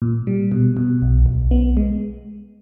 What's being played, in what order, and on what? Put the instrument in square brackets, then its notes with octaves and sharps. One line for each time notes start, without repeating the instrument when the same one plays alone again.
[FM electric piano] A#2
G3
B2
B2
B1
B1
B3
G#3